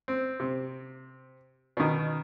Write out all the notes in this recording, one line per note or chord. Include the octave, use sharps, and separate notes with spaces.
C4
C3
B2 D#3